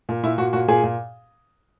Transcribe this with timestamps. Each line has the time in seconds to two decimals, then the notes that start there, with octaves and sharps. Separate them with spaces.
0.09 A#2
0.23 A#2 E4
0.38 A#2 F#4
0.53 A#2 F#4
0.68 A#2 G#4
0.83 A#2